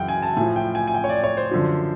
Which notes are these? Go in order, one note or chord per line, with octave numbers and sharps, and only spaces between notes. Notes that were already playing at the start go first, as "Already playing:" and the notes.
Already playing: F#2 C#3 E3 F#5 G5
G#5
A5
A2 F3 G#5
G5
G#5
G#5
G5
C#5
D5
C#5
C5
F#2 D3 F3